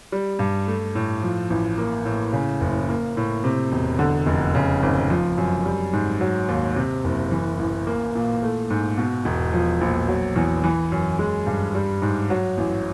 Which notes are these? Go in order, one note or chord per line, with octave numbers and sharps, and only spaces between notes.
G3
G2
A3
A2
F3
A1
A#3
A2
C#3
F#1
A#3
A2
C3
E1
D3
F1
C#3
G#1
F3
F#2
G3
G#2
F#3
D#2
C3
F#1
E3
A1
A#3
A#2
A3
G#2
B2
E1
F3
A#1
F#3
E2
E3
F#2
G#3
G2
G3
G#2
F#3
A1